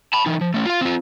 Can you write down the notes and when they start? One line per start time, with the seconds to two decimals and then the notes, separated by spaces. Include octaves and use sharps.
0.13 A5 B5
0.26 E3 D#4
0.41 F3
0.54 A3 C#4
0.66 F4 F5
0.81 C4 F4